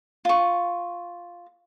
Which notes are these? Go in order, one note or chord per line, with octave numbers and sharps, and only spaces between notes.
F4 C#6